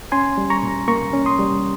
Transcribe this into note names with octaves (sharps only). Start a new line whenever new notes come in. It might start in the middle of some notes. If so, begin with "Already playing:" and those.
C#4 G#5 C6
G3
A#5 C#6
A#2
A#3 A#5 C#6
C#4
C6 D#6
G3